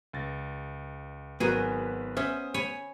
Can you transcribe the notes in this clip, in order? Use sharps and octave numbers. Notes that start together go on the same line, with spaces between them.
C#2 A6 A#6
G#1 F#3 B3 F#4 G#4 A#4 B4
B3 C#4 C5 E5 D#6
C#5 G#5 B5